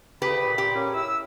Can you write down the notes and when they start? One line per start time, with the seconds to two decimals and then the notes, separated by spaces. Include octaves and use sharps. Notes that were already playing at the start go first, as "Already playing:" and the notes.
0.22 D2 C#3 G4 B4 B5
0.45 A#2
0.58 G4
0.74 A#3 C#4 G#4
0.95 E4 E6